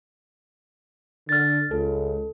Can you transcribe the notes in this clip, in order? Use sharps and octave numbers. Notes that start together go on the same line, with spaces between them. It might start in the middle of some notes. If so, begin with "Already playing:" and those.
D3 F6 A6
C#2 A4